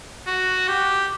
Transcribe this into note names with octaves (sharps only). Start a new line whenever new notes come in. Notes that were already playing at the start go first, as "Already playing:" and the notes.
F#4
G4